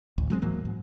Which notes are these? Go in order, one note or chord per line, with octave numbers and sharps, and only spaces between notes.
A1 D2
F#3 G#3 A#3 C4
G#2 E3 F#3 A#3
G#2